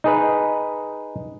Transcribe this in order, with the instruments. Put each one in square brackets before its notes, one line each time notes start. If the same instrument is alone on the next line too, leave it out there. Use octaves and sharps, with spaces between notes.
[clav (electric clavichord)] D#4 G#4 B4